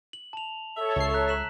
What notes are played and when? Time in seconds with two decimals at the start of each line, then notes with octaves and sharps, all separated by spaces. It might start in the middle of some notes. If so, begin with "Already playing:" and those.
0.13 F#7
0.33 A5 F7
0.77 A4 C#5 E5
0.96 C#2 C7
1.14 A#5 F#6 B6
1.28 B6 E7 F#7